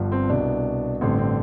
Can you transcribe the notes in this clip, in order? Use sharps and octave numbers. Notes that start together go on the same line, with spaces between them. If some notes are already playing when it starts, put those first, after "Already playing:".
Already playing: G1 G2 F3
C4
C2 B2 D4
A1 G2 D3 C4
C4